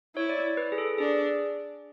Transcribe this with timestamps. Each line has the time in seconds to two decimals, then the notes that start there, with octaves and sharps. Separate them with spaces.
0.16 E4 C#5
0.29 D5
0.57 B4
0.72 G#4
0.78 A4
0.98 D4 G#4